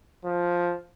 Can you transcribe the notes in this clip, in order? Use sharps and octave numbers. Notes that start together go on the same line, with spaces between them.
F3